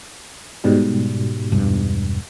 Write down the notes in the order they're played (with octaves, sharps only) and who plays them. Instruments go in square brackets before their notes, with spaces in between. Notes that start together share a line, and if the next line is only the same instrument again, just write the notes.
[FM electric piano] G#2 B2 G3
[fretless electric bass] E1 G2